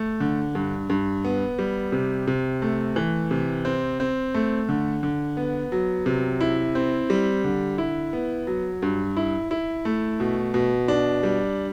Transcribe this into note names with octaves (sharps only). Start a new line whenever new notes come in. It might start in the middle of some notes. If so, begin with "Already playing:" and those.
Already playing: A3
D3
G2
G2
B3
G3
C3
C3
A3
E3
C3
C4
C4
A3
D3
D3
B3
F#3
C3
E4
C4
G3
D3
E4
B3
F#3
G2
E4
E4
A3
B2
B2
D4
G3